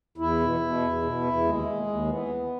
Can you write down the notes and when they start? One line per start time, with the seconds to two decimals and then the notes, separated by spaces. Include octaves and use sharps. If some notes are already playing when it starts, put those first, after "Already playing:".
0.18 E2 E4
0.40 B2
0.60 B2
0.81 E2
1.02 B2
1.24 E2
1.44 D#2 G#3
1.65 D#2
1.86 D#2
2.07 E3 B3
2.28 D#2